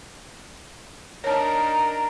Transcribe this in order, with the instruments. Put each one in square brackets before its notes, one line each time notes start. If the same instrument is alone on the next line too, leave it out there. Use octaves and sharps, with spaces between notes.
[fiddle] D4 [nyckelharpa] D#4 A#5 [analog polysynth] A#4 [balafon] C#5 A5